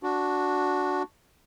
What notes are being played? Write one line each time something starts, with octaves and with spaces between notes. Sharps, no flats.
D4 F#4